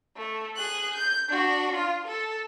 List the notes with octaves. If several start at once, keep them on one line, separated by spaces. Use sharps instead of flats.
A3
G#4 F#6
G6
D4 F#4
F4
A4